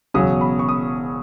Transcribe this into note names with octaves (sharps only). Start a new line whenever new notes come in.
E1 E2 C#3 F#3 C#4 D#6
B5
C#6
D#6